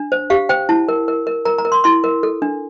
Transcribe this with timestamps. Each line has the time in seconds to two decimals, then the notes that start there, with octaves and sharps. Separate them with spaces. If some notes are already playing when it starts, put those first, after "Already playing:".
Already playing: D4
0.12 C5
0.30 G4 F5
0.49 C5 G5
0.69 E4 A5
0.89 A#4
1.08 A#4
1.27 A#4
1.45 A#4 A#5
1.58 A#5
1.65 A#4
1.72 C6
1.84 E4 C6
2.04 A#4
2.23 A4
2.42 D4